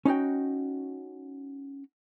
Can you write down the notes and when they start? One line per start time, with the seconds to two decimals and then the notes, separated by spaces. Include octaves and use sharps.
0.05 C#4 D#4 F#4 G5